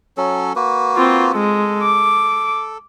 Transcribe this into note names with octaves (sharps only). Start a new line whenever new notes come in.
F#3 C#4 A4
A#3 F#4 B4
C4 F4
G#3 A4
D6